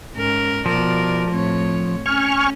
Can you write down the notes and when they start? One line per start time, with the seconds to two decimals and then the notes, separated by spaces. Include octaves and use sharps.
0.16 G#2 C#4 A#4
0.66 B2 F3 A#4 D5
1.29 A2 C4 C#5
2.06 C#4 G#5 C#6 F6